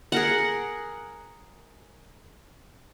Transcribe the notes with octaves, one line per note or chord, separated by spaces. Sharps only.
G#4 A#4 F#5